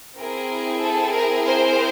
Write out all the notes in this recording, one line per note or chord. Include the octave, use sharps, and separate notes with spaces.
C4 E4 G#4 A#4
A4
A#4
A#4 C5